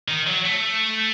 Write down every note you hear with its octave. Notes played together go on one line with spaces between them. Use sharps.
D#3
F#3
A3